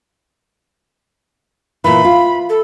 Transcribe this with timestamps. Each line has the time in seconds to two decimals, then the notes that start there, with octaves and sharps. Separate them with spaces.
1.84 A#2 E3 B5
2.05 F4
2.49 A4